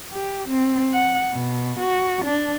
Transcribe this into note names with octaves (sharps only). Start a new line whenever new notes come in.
G4
C4
F#5
B2
F#4
D4